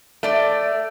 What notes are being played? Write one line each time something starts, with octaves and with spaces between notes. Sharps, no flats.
A3 D5